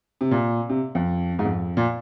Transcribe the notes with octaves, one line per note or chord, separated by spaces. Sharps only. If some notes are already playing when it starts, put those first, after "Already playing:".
C3
A#2
C3
F2
G#2
F2
A#2